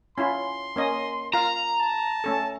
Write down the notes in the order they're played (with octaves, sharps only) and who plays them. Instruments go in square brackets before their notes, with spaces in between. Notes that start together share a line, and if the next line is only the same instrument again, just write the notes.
[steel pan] C#4 E4 F4 [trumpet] C6
[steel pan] A#3 C#4 D#5
[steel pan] F4 A#4 F5 [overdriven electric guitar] A#5
[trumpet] A5
[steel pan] A3 C#4 A4